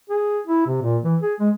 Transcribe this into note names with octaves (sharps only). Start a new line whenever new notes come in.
G#4
E4
C3
A#2
E3
G#4
G#3